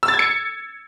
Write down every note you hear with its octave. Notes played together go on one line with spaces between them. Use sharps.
E6
A6
G#6
C#7